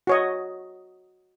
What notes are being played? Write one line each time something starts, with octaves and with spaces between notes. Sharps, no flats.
F#4 C#5 D#5